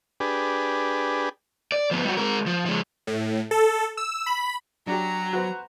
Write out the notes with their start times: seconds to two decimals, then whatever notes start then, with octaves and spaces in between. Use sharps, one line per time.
0.20 D4 G4 G#4 B4
1.72 D5
1.91 F3 B3
2.05 G3 F#4
2.17 G#3 A#4
2.46 F3
2.66 F3 G#3
3.07 A2
3.51 A4
3.97 E6
4.26 B5
4.87 F#3 D4 F#4 G4 A#5
5.33 F#4 B4 C5